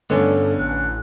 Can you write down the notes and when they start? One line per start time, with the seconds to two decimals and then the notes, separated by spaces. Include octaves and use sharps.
0.10 G2 D3 B3 C#4 A4
0.58 A1 F#6